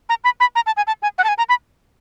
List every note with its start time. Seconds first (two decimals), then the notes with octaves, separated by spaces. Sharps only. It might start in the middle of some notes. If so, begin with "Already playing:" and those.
0.09 A#5
0.24 B5
0.40 B5
0.55 A#5
0.66 A5
0.77 G#5
0.87 A5
1.02 G#5
1.18 F#5
1.24 A5
1.28 G#5
1.38 A#5
1.49 B5